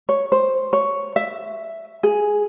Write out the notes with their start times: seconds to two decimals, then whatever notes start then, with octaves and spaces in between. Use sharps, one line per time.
0.09 C#5
0.32 C5
0.73 C#5
1.16 E5
2.03 G#4